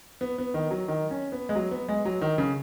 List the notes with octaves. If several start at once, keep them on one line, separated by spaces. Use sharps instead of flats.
B3
B3
D#3
F#3
D#3
C#4
B3
G#3
F#3
B3
G#3
F#3
D#3
C#3